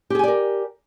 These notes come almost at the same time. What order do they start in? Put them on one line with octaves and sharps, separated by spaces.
G4 G#4 G#5 D5 A#4